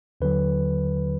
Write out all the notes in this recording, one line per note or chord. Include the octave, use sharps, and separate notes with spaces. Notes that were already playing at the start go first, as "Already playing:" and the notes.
D#2 D3 F#3 B4